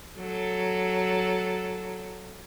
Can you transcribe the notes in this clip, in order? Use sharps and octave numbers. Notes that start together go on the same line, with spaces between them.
F#3 A4